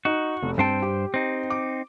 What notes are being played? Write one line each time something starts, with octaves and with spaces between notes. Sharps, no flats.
D#4 F#4
F1
G2 C4 C5 G5 A5
G4
C4 D#4
D6